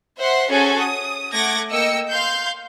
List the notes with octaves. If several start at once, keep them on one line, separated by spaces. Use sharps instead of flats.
C5 E5 F#5 C6
C#4 F#4 G#4 A4 G#5
D#6
A3 F#5 D6 G#6 A#6
A#3 D#5 G5 E6 A#6 C#7
F5 C6 G6